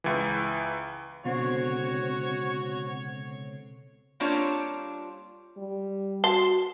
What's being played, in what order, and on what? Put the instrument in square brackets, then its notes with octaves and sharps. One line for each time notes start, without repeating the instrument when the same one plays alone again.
[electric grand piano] C#2 E3
[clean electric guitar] C#2 B2 [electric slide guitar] D3 C4 [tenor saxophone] F#4 [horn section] C#5
[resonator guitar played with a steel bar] G3 A#3 C4 D4 F4 C#5
[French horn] G3
[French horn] F#4 [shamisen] A5 [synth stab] C6